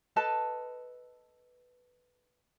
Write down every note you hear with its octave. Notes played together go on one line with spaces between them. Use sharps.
A4 B4 D#5 A5